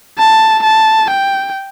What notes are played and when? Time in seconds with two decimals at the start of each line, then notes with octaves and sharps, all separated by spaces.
0.19 A5
0.64 A5
1.11 G5